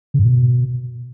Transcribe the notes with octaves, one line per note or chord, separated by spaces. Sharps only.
C#3
G2
B2